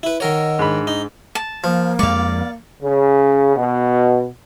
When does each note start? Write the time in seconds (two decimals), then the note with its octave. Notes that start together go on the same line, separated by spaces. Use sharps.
0.03 E4 B4
0.20 D#3 A#4 C#5 D#5 F#5 E6
0.59 G#2 D4 B5
0.87 D#4
1.35 A5
1.64 F3 A#3
1.99 F2 G#3 D5 F5 C#6
2.82 C#3
3.56 B2